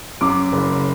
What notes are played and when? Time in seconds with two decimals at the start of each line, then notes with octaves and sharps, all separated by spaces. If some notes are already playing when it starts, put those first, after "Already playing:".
0.21 F#2 D6
0.52 F#1